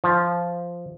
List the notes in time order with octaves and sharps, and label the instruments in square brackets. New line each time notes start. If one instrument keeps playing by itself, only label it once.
[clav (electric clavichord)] F3